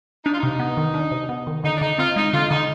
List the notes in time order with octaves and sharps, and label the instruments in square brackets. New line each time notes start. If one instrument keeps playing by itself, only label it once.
[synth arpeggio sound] D4 [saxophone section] D#4
[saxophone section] F4
[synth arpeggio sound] C3 [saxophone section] D#4
[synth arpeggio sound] B3
D#3
D4
C3
B3
D#3
[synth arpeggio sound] D3 [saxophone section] D#4
[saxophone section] D4
[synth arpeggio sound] D3 [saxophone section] D#4
[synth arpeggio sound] C4 [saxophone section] F4
[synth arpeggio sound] G#3 [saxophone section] D#4
[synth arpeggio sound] D3 [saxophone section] F4
[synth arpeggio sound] D3 [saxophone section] D#4